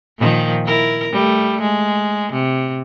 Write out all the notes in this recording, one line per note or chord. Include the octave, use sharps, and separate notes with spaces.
A#2 D#3 F3
E4 A#4
G3 A3
G#3
C3